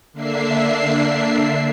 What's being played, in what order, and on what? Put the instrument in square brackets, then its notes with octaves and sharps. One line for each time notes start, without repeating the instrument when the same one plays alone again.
[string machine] D3 A#3 D4 E5 C7